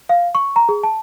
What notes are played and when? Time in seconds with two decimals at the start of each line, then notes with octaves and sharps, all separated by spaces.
0.09 F5
0.35 C#6
0.56 A#5
0.69 G#4
0.83 A5